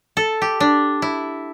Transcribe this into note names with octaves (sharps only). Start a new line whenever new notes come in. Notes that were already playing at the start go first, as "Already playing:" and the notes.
A4
G4
D4
E4